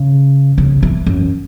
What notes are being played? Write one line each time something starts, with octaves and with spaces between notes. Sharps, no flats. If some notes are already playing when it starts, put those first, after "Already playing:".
Already playing: C#3
C#3
E3
F#2